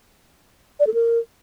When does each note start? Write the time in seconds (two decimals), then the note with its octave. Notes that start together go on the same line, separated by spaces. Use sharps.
0.80 D5
0.87 A4
0.94 A#4